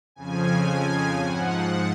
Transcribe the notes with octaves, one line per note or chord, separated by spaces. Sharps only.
F2 C#3 F3 G#5
G#5
G#2 F3 F#5